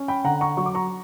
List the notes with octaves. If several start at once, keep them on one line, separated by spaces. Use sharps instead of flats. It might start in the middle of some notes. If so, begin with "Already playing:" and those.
Already playing: C#4
G5 B5
D3 F#5 A#5
A#5 C#6
F#3 C#6
D6
A#5 C#6